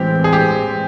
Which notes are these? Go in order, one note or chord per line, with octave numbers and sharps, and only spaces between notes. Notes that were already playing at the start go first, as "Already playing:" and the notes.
Already playing: A2 E3 G#3 C4 G4
G#4
G4